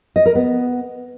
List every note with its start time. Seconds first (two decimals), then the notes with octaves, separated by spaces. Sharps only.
0.16 D#5
0.25 A#4
0.35 B3